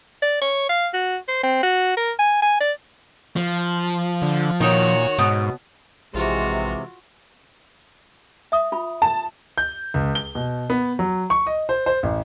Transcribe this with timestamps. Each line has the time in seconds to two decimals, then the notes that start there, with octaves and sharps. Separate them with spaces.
0.22 D5
0.41 C#5
0.69 F5
0.94 F#4
1.28 C5
1.43 C4
1.63 F#4
1.97 A#4
2.19 G#5
2.42 G#5
2.61 D5
3.36 F3
4.22 D3
4.60 A#2 D#3 F#4 C#5
5.18 G#2 B2
6.14 A#1 C3 E3 G#3 F4 F#4
8.52 E5 D#6
8.72 F4 B5
9.02 A5
9.58 G6
9.94 C#2
10.15 G7
10.35 B2
10.70 B3
10.99 F#3
11.30 C#6
11.47 D#5
11.69 C5
11.86 C5
12.03 A1